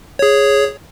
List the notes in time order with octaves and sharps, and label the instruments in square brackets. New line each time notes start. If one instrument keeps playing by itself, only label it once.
[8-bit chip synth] G#4 C#5